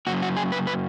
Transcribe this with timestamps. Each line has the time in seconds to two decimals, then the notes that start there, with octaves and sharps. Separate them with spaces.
0.07 F#2 C#3 F#3 A#3 F#4
0.22 F#4
0.37 G#4
0.52 B4
0.67 B4